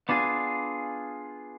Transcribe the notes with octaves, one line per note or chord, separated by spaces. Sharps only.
B3 D4 F4 G#4